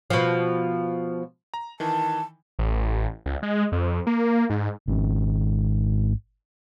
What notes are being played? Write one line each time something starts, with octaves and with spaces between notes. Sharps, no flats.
B2 F3
A#5
D#3 E3 A5
A1
C#2
G#3
F2
A#3
G#2
G#1 C#4